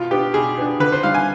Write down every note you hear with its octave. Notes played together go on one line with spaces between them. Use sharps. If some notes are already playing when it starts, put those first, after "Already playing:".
Already playing: B2 F4
B3 D4 G4
B2 G#4
B3 D4
D3 B4
C5
G3 D4 F5
G#5